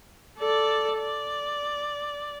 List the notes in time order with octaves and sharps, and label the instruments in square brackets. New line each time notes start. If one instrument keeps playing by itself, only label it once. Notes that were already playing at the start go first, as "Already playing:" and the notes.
[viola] A4 D5
D5